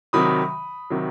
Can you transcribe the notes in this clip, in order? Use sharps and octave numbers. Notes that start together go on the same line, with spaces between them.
C3 D#3 F#3 B5 D#6
C3 D#3 F#3